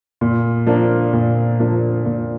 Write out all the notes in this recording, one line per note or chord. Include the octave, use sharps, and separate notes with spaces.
A#2
F3 A#3 D4
A#2
F3 A#3 D4
A#2